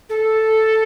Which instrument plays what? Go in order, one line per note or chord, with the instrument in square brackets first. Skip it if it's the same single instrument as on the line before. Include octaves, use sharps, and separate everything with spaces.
[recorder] A4